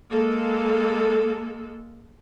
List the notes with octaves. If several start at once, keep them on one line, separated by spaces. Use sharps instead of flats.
G#3 A#3 A4